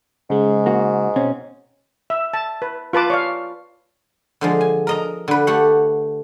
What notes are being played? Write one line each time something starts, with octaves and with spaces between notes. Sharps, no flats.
G#2 C#3 G#3
A#3 F#4
B2 C4 C#4
E5
A5
B4
F4 B4 A5 D6
C#5 D5 F5
D3 F3 G#3
G#5
A#4 D#5 A#5
D3 B4
A3 G4 F#5